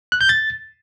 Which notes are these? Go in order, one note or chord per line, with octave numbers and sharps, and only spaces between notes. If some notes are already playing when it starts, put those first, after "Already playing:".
F#6
G6
A6